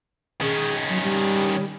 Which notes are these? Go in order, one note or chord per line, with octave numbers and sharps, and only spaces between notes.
D#3 C#4 G#4
F#3
G3